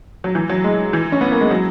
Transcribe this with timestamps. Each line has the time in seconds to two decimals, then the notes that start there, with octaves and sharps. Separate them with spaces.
0.24 F#3
0.35 E3
0.49 F#3
0.64 G#3
0.93 E3
1.12 C#4
1.21 B3
1.31 A#3
1.41 G#3
1.51 F#3